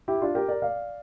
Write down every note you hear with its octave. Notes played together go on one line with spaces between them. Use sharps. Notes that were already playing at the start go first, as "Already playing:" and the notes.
E4 G4
D4 F4
G4 A#4
A#4 D5
D5 F5